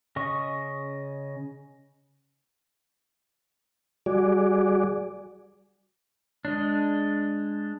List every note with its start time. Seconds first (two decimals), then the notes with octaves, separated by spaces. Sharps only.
0.16 C#3 D#5 C#6
4.06 G3 F#4 G#4 D5
6.45 G#3 D4